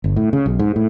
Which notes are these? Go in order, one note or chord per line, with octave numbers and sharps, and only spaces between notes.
G1
A2
C#3
B1
G#2
A2